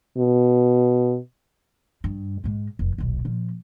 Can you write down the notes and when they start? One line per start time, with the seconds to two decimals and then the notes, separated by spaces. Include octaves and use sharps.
0.17 B2
2.04 G2
2.44 G#2 G#3
2.79 F1
2.98 D#1 B1
3.25 A#2 F3